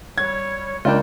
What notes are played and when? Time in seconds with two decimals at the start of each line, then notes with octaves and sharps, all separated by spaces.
0.18 G3 C#5 G#6
0.85 C#2 A#3 D4 F4 G5